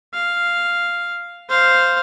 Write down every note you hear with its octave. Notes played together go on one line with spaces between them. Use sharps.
F5
C5 F5